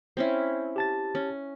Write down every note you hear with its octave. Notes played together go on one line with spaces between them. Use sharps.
C4 C#4 E4
G4 A5 A6
C#4